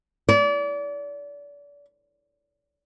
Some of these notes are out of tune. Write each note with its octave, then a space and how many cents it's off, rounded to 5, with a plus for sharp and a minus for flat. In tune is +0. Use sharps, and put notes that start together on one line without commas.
D5 -35